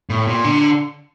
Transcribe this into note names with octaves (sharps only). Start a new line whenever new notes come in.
A2
A#2
D3